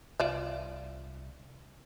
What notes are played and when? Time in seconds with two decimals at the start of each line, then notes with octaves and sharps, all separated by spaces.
0.20 C2 F4 D5 E5